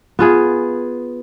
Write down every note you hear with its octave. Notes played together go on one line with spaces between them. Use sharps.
B3 F4 G#4